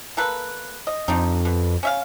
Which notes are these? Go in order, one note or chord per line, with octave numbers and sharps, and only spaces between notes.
A#3 A4 B4
D#5
F2 C4 D4 D#4
B2
C#4 E5 F5